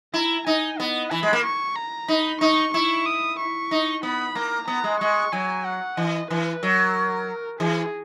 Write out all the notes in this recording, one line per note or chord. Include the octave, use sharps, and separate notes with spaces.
E4 A#5
D#4 G#5
B3 D#5
E3 B5
G#3
A#3
C#6
A#5
D#4 B5
D#4 C#6
E4 C#6
D#6
C#6
D#4
B3 B5
A#3 A#5
B3 A#5
G#3
G#3 C#6
F#3 G#5
F#5
E3 D#5
E3 B4
F#3 A#4
E3 G#4